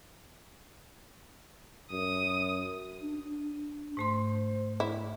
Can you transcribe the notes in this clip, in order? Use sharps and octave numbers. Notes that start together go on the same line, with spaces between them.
F#2 D#6
D4
D4
G#2 A3 C5 C6
E4